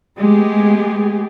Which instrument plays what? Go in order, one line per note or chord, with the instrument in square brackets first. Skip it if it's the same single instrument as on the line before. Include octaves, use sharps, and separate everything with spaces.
[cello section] G#3 A3 B3 G4 G#4